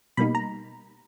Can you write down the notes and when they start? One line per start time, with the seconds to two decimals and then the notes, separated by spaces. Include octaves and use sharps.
0.17 B2 G3 A#3 D#4 B5
0.35 A#5